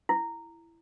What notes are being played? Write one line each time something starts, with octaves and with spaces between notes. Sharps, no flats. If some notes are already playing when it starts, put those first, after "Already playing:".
E4